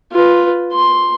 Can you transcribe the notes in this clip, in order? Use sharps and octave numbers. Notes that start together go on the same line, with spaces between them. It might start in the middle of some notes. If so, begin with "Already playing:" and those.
F4 B4
C6